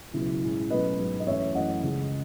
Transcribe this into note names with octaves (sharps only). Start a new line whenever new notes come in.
C#2 B2 F#3 E4
A2 G#3 C#4
B2 F#3 A3 C#4 B4 D#5
G#2 F#3 B3
D#5
F#2 E3 A3 C#4 C#5 E5
F#2 E3 A3 D#5 F#5
C#2 C#3 G#3